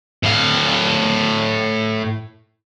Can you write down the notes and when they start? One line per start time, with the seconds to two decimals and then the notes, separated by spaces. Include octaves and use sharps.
0.23 A2 F5